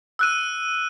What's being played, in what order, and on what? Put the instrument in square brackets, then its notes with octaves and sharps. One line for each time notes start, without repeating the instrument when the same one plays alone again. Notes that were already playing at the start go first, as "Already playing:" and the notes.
[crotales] E6 F#6 D#7